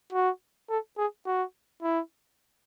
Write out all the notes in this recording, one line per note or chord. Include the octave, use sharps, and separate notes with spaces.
F#4
A4
G#4
F#4
E4